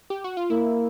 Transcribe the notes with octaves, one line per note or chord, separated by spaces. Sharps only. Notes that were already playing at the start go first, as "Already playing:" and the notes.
G4
F#4
F4
A#3 E4